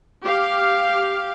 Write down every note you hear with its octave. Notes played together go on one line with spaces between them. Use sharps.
G4 F5